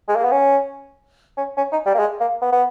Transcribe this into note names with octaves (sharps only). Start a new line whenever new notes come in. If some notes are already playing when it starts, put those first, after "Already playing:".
G#3
A#3
B3
C#4
C#4
C#4
D#4
G3
A#3
G#3
A#3
B3
B3